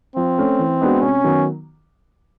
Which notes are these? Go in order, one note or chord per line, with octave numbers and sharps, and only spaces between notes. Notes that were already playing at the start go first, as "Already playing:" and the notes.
F3 C4
A3 C#4
E3
G#3 B3 D4 F#4
C3 C#4
D#3 F#3 B3